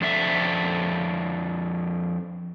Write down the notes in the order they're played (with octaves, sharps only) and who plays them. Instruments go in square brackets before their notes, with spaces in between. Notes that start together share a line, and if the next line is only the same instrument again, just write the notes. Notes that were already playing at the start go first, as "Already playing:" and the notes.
[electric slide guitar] F2 D4 E5